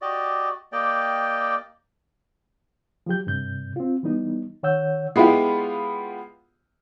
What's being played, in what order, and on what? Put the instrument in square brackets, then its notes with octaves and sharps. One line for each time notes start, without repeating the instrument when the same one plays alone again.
[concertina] F#4 G4 D5 D#5
A#3 G4 D5 D#5 G5
[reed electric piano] F3 F#3 G4 G6
G2 C3 G6
C4 F4
E3 G3 B3 D#4
D#3 C#5 F#5 E6 G6
[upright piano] G#3 B3 E4 F4 G4